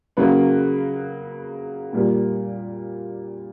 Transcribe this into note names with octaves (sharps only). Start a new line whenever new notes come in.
C#3 F#3 A#3 B4
A#2 G3 A#3